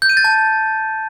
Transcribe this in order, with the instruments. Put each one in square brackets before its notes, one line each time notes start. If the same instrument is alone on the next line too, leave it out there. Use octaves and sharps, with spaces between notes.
[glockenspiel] G6
D#7
A6
A5